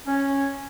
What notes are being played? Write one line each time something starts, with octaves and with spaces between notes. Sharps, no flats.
C#4